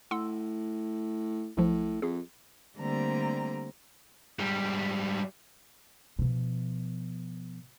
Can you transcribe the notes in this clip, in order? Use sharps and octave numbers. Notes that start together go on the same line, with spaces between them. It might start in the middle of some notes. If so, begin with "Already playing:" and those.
A2 F#5 C6 E6
B1 A2 F3
F2 G#4
D3 G3 A3 A#3 C4 A#5
G#2 G3
B2 F3